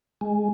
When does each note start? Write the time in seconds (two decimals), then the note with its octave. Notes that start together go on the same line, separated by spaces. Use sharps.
0.21 G#3